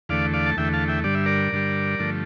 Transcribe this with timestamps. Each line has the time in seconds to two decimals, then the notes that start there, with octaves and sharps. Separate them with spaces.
0.09 E2 D3 A3 D5 F5
0.34 D5 F5
0.46 A5
0.57 E2 D3 A3 E5 G5
0.73 F5 A5
0.88 E5 G5
1.04 G2 D3 G3 D5
1.15 E5
1.26 A#4 D5
1.52 G2 D3 G3
1.99 G2 D3 F3 A3